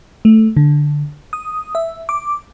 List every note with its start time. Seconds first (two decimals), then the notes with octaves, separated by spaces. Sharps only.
0.25 A3
0.57 D3
1.33 D#6
1.75 E5
2.09 D6